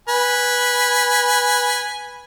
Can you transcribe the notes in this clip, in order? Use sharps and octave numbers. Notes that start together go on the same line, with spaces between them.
B4 G#5